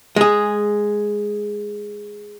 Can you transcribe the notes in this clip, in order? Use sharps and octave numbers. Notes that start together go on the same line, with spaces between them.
G#3 G#4